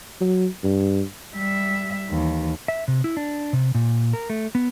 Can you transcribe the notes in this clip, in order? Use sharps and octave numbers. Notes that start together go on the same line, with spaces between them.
F#3
G2
G3 E5
D#2 E3
E5
C3
E4
D4
C3
A#2
A#4
A3
B3